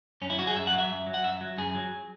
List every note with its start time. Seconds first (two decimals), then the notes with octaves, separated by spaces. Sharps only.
0.22 F#2 C#4
0.30 E4
0.39 F#3 F#4
0.47 G#4
0.56 F#2 E5
0.67 F#5
0.73 F#3
0.78 E5
0.90 F#2
1.06 F#3
1.14 F#5
1.24 F#2 E5
1.41 F#3
1.58 F#2 G#4
1.75 F#3